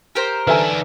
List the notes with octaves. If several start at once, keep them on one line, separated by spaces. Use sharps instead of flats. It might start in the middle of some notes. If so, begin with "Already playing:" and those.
G4 A#4 C5
D#3 D4 A4 B4 E5 G#5